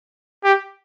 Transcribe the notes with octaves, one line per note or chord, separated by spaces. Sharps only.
G4